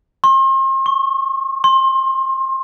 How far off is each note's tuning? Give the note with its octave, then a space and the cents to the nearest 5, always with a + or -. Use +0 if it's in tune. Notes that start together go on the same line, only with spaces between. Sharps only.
C6 +40
C#6 -20
C6 +25